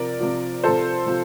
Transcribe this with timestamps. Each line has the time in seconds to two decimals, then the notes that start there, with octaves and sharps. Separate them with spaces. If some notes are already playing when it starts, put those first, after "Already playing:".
Already playing: C3 F3 A#4 D5
0.20 C3 F3
0.64 C3 F3 A4 C5
1.07 C3 F3